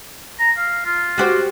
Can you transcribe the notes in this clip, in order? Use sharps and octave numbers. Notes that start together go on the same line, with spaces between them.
A#5
F5
F4
F#4 G4 C5